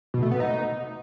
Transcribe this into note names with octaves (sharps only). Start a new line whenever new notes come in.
B2
A3
B3
D#4